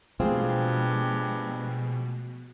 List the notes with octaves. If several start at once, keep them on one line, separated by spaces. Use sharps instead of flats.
G2 B2 F3 G#3 A3 C4 F4 G#4